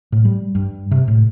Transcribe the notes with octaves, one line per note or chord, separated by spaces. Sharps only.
A2
G3
G2
C3
A2